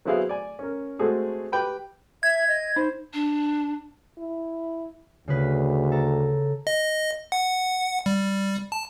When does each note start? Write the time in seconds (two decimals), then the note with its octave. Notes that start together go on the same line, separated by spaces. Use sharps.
0.05 F#3 B3 C4 E4 G#4 F5
0.29 D5 G#5
0.59 C#4 A#4
0.99 G#3 A3 C4 F#4 G#4 A4
1.52 G4 B4 G5 B5
2.23 E5 G#6
2.48 D#5
2.76 D#4 C5
3.13 D4
4.18 E4
5.28 D2 C#3 G#4 B4
5.92 A4 A#5
6.67 D#5
7.32 F#5
8.06 G3
8.72 A5